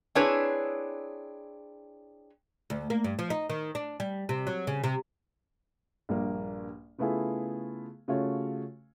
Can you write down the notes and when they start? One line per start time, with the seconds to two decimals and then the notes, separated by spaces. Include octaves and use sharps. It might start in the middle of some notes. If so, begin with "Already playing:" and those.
0.15 C4 D4 E4 G#4 B4 C#5
2.70 D2
2.90 A#3
3.04 G2
3.19 F3
3.30 D#4
3.49 D#3
3.75 D4
4.00 G3
4.29 C3
4.47 F#3
4.67 C#3
4.84 C3
6.09 A#1 G2 A#3
6.98 C#3 A3 B3 E4 F4 G#4
8.08 C#3 A3 C#4 F4 F#4 C#5